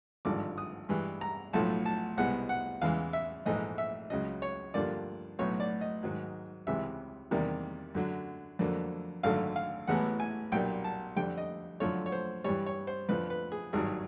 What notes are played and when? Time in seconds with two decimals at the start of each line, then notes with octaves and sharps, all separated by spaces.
0.25 G#1 G2 D3 F3 G#3 D6
0.58 D#6
0.89 G2 E3 G#3
1.21 A#5
1.53 B1 A2 F3 A3 A5
1.86 A5
2.17 C2 B2 G#3 B3 F#5
2.49 F#5
2.82 E2 C#3 E3 G#3 F5
3.13 E5
3.46 A#1 G#2 E3 A3 D#5
3.78 E5
4.10 C#2 C#3 F#3 D#5
4.42 C#5
4.74 G2 D3 F3 A#3 D5
5.39 B1 A2 F#3 B3 C#5
5.60 D5
5.81 D#5
6.03 G#2 D#3 F#3
6.67 C#2 C3 E3 G#3 E5
7.31 E2 C3 D#3 G3 A#3
7.95 F#2 D3 F#3
8.59 F2 D3 F#3 A#3
9.23 G#1 F#2 D3 F#3 A3 F5
9.56 F5
9.87 A1 A2 E3 G#3 B3 F#5
10.20 G#5
10.52 B1 A#2 G3 A#3 G5
10.84 A5
11.16 F2 D3 G3 G5
11.38 D#5
11.80 F#2 D3 F3 A3 C#5
12.06 C#5
12.12 C5
12.44 G2 E3 G3 C#5
12.66 C#5
12.87 C5
13.09 F2 D3 F3 B4
13.30 B4
13.52 G#4
13.73 G#1 G2 D#3 F#3 G#4